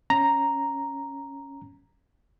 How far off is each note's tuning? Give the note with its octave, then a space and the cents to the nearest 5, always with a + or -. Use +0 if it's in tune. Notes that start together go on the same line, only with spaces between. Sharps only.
C#4 +0 A#5 +0